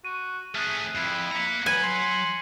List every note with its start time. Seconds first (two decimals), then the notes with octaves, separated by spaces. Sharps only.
0.05 F#4 D#7
0.55 A3 C#4 G#4 F6 F#6
0.95 F2 E4 C7
1.31 A#3 A#5 B6 C#7
1.66 F#3 B4 G#5 G#6 D#7 F#7
1.83 C6